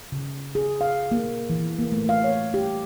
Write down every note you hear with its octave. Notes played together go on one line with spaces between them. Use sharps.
C#3
G#4
F5
A#3
E3
A#3
A3
F5
C#5
G4